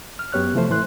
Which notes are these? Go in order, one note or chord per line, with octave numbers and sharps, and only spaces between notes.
F6
F#2 B3 G4 C#5 F6 F#6
C3 E3 F3 A3 C5
A2 E3 C6 F#6